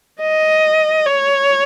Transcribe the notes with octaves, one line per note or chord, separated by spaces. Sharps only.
D#5
C#5